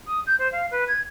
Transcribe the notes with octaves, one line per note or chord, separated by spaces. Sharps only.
D#6
G6
C5
F5
B4
G#6